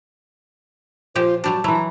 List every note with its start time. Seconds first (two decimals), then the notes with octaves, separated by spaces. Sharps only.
1.15 A#2 F3 F4 G4 C5
1.44 F#3 G3 D4 F#4 A5
1.64 E3 F#3 E4 A#5